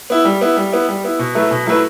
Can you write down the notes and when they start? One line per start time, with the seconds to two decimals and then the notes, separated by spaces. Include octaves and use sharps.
0.10 B3 E4
0.25 G3
0.41 B3 E4
0.57 G3
0.72 B3 E4
0.88 G3
1.04 B3 E4
1.19 B2
1.35 F#3 A3 E4 B4
1.51 B2
1.66 F#3 A3 E4 B4